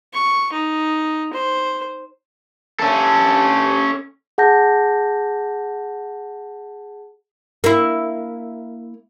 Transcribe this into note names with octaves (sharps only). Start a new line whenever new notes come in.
C#6
D#4
C5
C#4 A4
G#4 F#5 A5 G6 A#6
A#3 E4